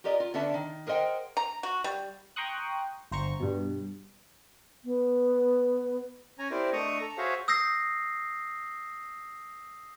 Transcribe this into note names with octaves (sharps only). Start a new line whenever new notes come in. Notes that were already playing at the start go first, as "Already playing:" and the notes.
F4 G4 A#4 D5 D#5
F4
D3 B3 C#4 D4 E5 A5
D#3
G#4 A#4 C5 D#5 F#5 G5
A#5
F#4
G3
G5 A#5 C6 C#6 D#6 F#6
G1 C5 A#5 C#6
G2 B2
B3
C#4 G#5 A#5
C4 E4 G4 A#4 C5 D5
A3 D4 D#5 A#5 C#6 D#6
A4 A#5
F#4 G#4 C5 C#5 E5 F5
D#6 E6 G6 A#6 C7